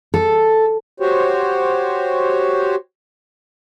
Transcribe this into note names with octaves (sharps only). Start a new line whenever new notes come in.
A4
F#4 G4 C5 C#5